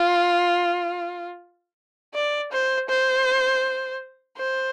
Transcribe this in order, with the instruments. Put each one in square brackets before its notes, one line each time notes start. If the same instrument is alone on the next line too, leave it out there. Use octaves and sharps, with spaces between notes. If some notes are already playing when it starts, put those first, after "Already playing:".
Already playing: [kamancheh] F4
D5
C5
C5
C5